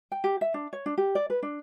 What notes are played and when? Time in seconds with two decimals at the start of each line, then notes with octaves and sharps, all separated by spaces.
0.12 G5
0.24 G4
0.41 E5
0.54 D4
0.73 C#5
0.86 D4
0.98 G4
1.15 D5
1.30 B4
1.43 D4